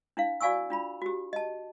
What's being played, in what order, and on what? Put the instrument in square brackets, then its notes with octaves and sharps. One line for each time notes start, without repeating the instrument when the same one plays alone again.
[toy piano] D4 E4 F5
F#4 D5 F5 G#5 C#6 E6
D4 F4 B5
F#4 G4
D#5 A5